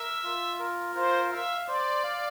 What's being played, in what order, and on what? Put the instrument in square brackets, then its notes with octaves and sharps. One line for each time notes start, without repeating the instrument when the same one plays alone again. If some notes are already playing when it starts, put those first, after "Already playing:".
Already playing: [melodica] A#4 [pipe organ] E5
[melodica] F4
A#4
[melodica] F4 [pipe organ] C5
[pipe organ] E5 [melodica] F5
[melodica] C5 [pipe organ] D5
[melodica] F5